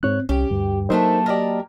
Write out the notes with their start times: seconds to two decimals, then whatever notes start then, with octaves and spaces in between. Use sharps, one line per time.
0.03 G#2 C4 C#5 F#6
0.29 C2 C#4 G4
0.50 D2 G2
0.90 F#3 A3 A#3 D4 D#4 A#4 C5 E5
1.26 G4 A#4 D5 D#5 A5